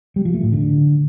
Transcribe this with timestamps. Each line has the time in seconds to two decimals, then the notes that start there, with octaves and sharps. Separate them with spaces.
0.16 G3
0.25 F3
0.34 A3
0.43 A2
0.52 D3